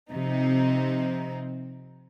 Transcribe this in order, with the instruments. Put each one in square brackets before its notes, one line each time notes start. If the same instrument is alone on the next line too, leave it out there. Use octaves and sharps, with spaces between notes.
[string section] C3 F3 C4 D#4